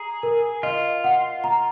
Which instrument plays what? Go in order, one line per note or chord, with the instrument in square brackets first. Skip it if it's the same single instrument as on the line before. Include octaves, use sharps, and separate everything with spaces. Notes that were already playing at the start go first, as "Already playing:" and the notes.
Already playing: [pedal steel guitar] G#4 [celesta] A#5
[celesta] A#4
[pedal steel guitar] F4 [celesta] D#5
[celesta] F#5
A#5